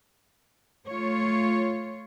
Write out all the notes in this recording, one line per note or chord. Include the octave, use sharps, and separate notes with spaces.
A3 F4 C#5